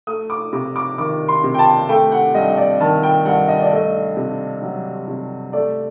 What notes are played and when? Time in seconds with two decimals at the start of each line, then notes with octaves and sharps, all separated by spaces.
0.07 A3 D#6
0.30 D6
0.53 C3 D6
0.76 D6
0.98 D#3 D6
1.28 C6
1.44 C3
1.54 G5
1.59 A5
1.89 A3 G5
2.12 F#5
2.35 G2 D#5
2.58 D5
2.80 D#3 A5
3.03 G5
3.26 G2 F#5
3.48 D#5
3.62 D5
3.72 A3 D#5
4.17 C3
4.62 F#3
5.08 C3
5.53 A3 D5